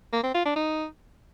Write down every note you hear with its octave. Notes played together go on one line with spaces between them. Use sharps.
A#3
C4
F4
D4
D#4